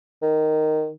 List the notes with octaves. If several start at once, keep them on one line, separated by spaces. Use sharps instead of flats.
D#3